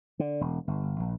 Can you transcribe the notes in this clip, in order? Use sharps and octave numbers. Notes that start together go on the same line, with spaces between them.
D3
E1
G1
A#1